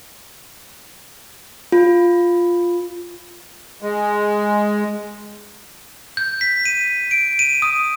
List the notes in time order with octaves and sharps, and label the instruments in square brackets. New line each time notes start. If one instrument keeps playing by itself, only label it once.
[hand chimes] F4
[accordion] G#3
[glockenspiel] G6
B6
D#7
D7
D#7
D#6